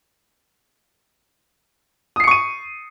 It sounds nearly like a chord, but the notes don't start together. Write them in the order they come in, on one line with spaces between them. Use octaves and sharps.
D#6 C7 C#7 C#6 D#7